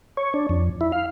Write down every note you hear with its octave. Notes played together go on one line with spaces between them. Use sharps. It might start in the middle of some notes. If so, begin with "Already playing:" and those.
C#5
D4
F2
E4
F5